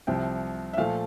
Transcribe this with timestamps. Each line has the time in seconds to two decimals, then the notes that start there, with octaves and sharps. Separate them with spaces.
0.07 C2 C3 F3 G5
0.73 E5
0.77 A#2 F3 A3 F5